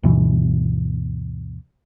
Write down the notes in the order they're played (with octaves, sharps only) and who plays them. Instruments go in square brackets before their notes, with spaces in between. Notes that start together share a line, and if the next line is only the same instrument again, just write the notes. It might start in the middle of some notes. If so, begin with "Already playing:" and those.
[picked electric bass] D2 G2 B2 E3